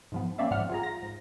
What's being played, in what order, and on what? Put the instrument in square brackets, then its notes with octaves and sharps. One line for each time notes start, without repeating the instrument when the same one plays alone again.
[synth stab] G#2 F3 B3
A#3 C4 C#4 D5 E5 F5
G#2 F3 G3 F#5 F6
F4 G#4 A#5
F4 A#6
G#2